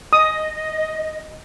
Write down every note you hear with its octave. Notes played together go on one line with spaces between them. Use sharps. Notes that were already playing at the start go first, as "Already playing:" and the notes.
D#5 D#6